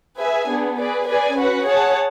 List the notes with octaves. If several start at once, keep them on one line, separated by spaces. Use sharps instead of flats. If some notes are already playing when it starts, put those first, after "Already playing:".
G#4 B4 E5 G#5
B3 D4 G#4
G#4 B4 D5
G#4 B4 D5 G#5
C#4 F#4 B4 F#5
G#4 C#5 F#5 A5